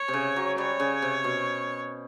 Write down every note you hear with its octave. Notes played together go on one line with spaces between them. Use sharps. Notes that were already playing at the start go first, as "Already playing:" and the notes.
Already playing: C#5
C3
C#3
F#3
G3 C#5
C#3
C3
B2